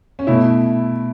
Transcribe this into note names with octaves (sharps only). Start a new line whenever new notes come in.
C#4
B2 A3 E4